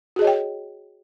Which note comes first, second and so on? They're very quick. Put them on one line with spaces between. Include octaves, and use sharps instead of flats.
F#4 G#4 D#5 C#5 G5